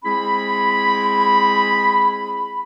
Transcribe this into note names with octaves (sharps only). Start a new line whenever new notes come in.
G#3 C4 E4 G#4 B5